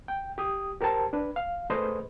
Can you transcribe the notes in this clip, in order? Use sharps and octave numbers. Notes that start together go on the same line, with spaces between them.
G5
G4 D#6
G4 A#4 C5 G5 A5
D4 B4
F5
A3 G#4 B4 C5 D#5